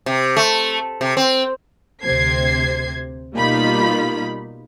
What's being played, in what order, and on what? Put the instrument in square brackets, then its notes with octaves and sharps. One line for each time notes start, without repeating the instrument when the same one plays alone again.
[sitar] C3
A3
C3
C4
[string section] D2 C3 C5 G#6 C7
B2 G3 A#3 D#4 F4 B5